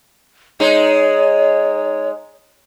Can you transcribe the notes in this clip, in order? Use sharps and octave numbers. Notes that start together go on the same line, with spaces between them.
G#3 D#4 C#5